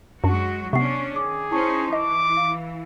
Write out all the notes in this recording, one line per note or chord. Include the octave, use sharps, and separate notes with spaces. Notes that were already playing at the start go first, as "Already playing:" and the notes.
F#2 F#3 G#3 D4 F#4
C3 B3 C#4 D4 C#6 C7
D#3 G#4 D6
C#4 D#4 E4 C5 A5 C#6
E3 D#5 D6
F5